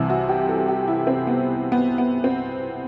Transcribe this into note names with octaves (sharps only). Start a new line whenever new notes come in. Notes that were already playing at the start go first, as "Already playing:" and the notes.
Already playing: C2 C3 E3
F#4
G4
A4
G4
E4
C4
B3
B3
B3
C4